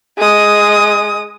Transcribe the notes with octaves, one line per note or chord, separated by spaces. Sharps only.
G#3 D#6